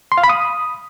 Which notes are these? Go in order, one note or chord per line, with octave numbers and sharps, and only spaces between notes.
C6
F5
B5
D#6